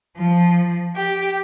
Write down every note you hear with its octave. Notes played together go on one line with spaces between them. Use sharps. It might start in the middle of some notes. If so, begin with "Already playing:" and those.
F3
G4